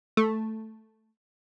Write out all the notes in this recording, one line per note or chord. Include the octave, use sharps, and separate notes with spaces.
A3